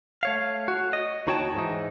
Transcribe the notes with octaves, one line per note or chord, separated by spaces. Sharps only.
A3 C#5 F5
F#4
D#5
D#2 D#4 F#4 C#5 G5 A5
G#2 E3 D#4